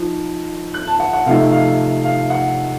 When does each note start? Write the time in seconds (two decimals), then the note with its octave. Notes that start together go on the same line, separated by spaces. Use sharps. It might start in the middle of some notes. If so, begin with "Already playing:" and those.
Already playing: F3 D#4
0.74 F#6
0.87 A5
1.00 F#5
1.13 F#5
1.26 C3 F3 A3 D#4 F5
1.52 F5
2.05 F5
2.30 F#5